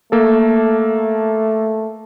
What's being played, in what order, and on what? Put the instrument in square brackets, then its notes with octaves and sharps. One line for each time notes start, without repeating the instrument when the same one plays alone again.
[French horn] A3 [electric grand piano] A#3 A4